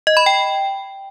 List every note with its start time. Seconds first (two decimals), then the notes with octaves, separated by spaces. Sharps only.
0.07 D#5
0.17 B5
0.26 G5